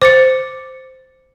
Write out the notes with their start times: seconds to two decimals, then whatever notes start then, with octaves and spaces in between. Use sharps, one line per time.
0.02 C5 D6 A6 C#7